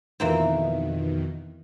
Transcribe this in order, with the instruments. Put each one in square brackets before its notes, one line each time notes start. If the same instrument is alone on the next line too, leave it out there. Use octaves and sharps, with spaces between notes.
[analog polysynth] F2 B2 D#3 [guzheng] E3 A#3 C4